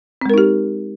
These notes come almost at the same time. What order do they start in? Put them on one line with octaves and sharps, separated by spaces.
C4 G#3 A#4 D#4 G4